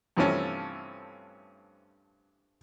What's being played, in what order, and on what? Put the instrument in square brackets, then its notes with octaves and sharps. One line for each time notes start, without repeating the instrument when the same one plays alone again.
[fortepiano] G2 C3 E3 F3 A3 C#4